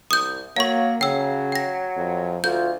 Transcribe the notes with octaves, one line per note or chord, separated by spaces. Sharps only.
C2 D#6 G6
F#3 A#3 F5 C#6
C#3 F#3 G5 E6
G5 A#6
F2
D2 F4 G6